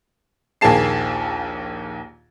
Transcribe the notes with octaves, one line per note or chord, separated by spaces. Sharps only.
A#1 D#2 A#3 G#4 A5 C7